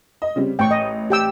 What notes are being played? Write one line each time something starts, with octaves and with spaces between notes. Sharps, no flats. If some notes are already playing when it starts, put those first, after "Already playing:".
D#5
C#3 G3 C4
A1 G5 C#6
D#5
G4 G5 E6